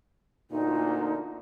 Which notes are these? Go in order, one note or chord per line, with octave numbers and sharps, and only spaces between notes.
D2 A#2 D#4